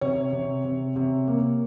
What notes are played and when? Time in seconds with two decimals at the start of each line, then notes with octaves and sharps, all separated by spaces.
0.01 C3 C#5
0.32 C3
0.65 C3
0.96 C3
1.27 A#3